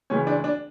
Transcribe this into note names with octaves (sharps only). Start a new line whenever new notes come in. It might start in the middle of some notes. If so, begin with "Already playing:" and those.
C#2 C#3 E3 C#4
D4
D4